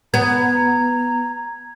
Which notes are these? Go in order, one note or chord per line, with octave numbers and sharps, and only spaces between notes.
B3 A#5 G#6